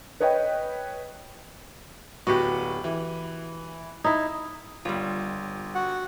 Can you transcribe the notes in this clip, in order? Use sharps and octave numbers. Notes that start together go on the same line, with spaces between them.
B4 C#5 D#5 G5
D1 B3 F#4 G4
E3
D#4 E4
G1 G3 F4
F#4 F#5